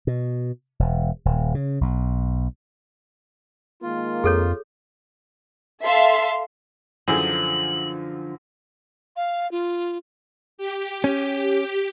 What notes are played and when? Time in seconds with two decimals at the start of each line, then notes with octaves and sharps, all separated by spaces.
0.07 B2
0.79 E1
1.25 D#1
1.55 C#3
1.81 B1
3.82 D#3 G#3 A#3 F4
4.24 F2 G#4 A4 C#5
5.85 A4 E5 F5 C6
7.08 F#2 D3 E3 F3 G#4 F#7
9.16 F5
9.52 F4
10.58 G4
11.04 C#4